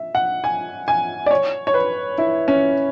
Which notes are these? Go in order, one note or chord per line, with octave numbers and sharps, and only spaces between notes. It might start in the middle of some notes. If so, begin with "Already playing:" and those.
Already playing: E5
F#5
G#5
G#5
D5
C#5
C#5
B4
E4
C#4